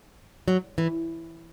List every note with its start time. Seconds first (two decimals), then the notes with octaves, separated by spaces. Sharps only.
0.48 F#3
0.78 E3